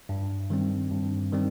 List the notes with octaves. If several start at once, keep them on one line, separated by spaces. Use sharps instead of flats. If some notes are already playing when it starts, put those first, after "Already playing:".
G2
D#3 G3 C4
G2
D#3 G3 C4